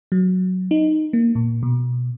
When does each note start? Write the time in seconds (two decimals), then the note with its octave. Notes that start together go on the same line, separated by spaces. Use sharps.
0.12 F#3
0.71 D#4
1.13 A#3
1.35 A#2
1.63 B2